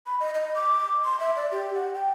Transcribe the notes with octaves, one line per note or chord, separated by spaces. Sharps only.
B5
D#5
D#5
D6
C6
E5
D5
G4
F#5
G5